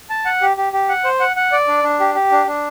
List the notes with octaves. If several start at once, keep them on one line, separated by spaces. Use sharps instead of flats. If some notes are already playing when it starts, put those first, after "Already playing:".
A5
F#5
G4
G4
G4
F#5
C5
F#5
F#5
D5
D4
D4
G4
G4
D4
D4